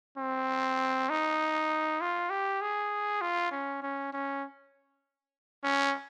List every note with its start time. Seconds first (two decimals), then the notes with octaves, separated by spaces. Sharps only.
0.18 C4
1.10 D#4
2.01 F4
2.30 G4
2.62 G#4
3.22 F4
3.51 C#4
3.83 C#4
4.13 C#4
5.64 C#4